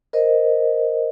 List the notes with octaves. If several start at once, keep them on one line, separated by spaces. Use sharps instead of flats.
A#4 C5 D#5